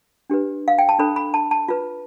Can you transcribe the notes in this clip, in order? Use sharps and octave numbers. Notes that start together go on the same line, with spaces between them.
D4 G4 B4
F5
G5
A5
D4 A4 C5 B5
B5
A5
A5
F4 B4